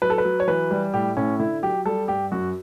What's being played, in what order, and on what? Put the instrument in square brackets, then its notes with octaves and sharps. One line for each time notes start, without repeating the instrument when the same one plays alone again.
[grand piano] F#3 B4
A4
B4
F#3
C#5
E3 B4
G3
A2 G4
A2 C#4
D3 E4
F#3 G4
G3 A4
G2 G4
F#2 F#4